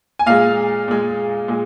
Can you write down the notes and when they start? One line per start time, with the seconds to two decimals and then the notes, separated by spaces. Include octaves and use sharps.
0.19 G#5
0.26 A#2 G#3 F5
0.88 A#2 G#3
1.48 A#2 G#3